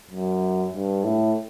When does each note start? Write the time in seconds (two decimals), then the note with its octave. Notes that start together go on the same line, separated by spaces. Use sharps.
0.11 F#2
0.74 G2
1.04 A2